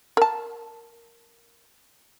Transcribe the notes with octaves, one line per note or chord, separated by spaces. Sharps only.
A#4 A5